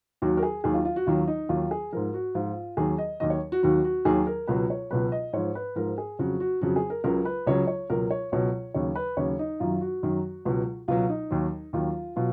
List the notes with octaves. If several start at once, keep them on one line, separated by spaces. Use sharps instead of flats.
D#2 D#3 F#3 F#4
A#4
G#4
D#2 D#3 F#3 G#4
F4
F4
F#4
D#2 D#3 F#3 F4
D#4
D#2 D#3 F#3 F4
G#4
G#2 F3 A#4
F#4
G#2 F3 F4
D#2 D#3 F#3 G#4
D#5
D#2 D#3 F#3 D#5
C#5
F#4
D#2 D#3 F#3 F#4
F#4
D#2 D#3 F#3 G#4
A#4
C#2 B2 F#3 B4
C#5
C#2 B2 F#3 B4
D#5
G#2 F3 C#5
B4
G#2 F3 A#4
G#4
F2 C#3 F#3 F#4
F#4
F2 C#3 F#3 F#4
G#4
A#4
C#2 C#3 F#3 A#4
B4
C#2 C#3 F#3 C#5
C#5
C#2 B2 F#3 A#4
C#5
C#2 B2 F#3 C#5
D#2 C#3 F#3 C#5
B4
D#2 C#3 F#3 C#5
D#4
F#2 D#3 F#3 F4
F#4
F#2 D#3 F#3
C#2 B2 F#3
C#2 B2 F#3 F4
D#4
D#2 D#3 F#3
D#2 D#3 F#3 F4
B2 F#3 F4